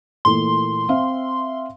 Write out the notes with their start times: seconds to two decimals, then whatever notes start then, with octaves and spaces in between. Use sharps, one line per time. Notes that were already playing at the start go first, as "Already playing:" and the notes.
0.25 A#2 E3 A3 C6
0.89 C4 E5 F5